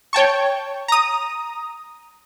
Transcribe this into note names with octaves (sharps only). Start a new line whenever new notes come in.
C#5 G5 A5 C#6
A#5 D#6